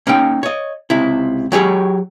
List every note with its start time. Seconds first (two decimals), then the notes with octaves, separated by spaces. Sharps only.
0.07 A#3 C#4 D#4 G5
0.43 C#5 D#5
0.90 C#2 C3 E4
1.52 F#3 G4 G#4 C#5